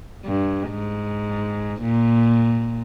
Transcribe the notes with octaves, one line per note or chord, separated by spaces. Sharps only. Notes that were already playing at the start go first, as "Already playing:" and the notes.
G2
G#2
A#2